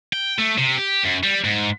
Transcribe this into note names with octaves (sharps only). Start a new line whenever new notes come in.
G5
A3
C3
G4
F#2
G3
G#2